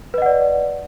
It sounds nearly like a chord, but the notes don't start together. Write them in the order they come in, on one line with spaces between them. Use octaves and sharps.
B4 D#5 F#5 D5